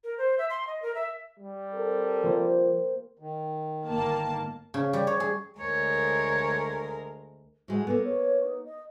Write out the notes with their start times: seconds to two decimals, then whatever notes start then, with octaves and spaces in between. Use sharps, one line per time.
0.04 A#4
0.18 C5
0.38 E5
0.50 C6
0.67 D#5
0.82 A#4
0.95 E5
1.39 G3
1.73 C4 A4 A#4
2.23 F3 A#3 G4 C5
3.19 D#3
3.87 G1 A#3 A5
4.74 C#3
4.93 G3
5.07 C#5
5.20 G#4
5.60 D2 G#3 A#4 C#5
7.68 A2 G#3 F#4
7.87 A#3 B3 A4
8.04 C#5
8.44 D#4
8.65 D#5